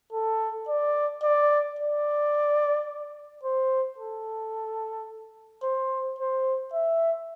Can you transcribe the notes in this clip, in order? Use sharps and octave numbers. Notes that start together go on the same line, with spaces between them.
A4
D5
D5
D5
C5
A4
C5
C5
E5